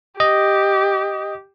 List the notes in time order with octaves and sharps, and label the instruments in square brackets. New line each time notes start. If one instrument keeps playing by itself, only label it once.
[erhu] G4 [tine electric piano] D#5